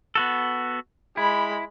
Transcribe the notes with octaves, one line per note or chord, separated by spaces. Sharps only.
B3 F#4 A4
G#3 E4 B5